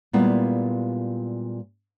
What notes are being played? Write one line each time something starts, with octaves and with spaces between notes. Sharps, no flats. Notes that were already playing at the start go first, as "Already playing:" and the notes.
A#2 G3 G#3 B3 E4 F4